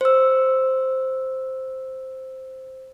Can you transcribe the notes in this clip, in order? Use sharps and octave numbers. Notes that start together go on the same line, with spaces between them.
C5 E6